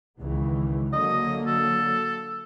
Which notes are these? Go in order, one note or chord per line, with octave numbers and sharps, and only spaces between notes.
C#2 D#3 E3
D3 F#3 A#3 D#5
A4